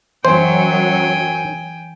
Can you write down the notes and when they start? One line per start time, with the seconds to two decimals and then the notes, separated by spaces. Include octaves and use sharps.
0.25 F#2 E3 F#3 C5 G5 G#5